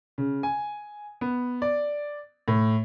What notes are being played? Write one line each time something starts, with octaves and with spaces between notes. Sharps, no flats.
C#3
G#5
B3
D5
A2